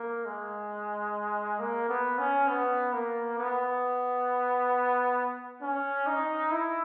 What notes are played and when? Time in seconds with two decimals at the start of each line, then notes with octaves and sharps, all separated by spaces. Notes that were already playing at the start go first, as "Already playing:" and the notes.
Already playing: A#3
0.26 G#3
1.59 A#3
1.89 B3
2.19 C#4
2.49 B3
2.93 A#3
3.39 B3
5.62 C#4
6.07 D#4
6.51 E4